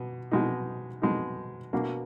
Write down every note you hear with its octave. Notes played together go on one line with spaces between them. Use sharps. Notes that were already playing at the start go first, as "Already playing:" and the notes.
Already playing: B2
B2 G#3 D#4
B2 G#3 D#4
B2 A#3 D4 F#4